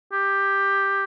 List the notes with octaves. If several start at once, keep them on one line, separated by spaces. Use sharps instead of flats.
G4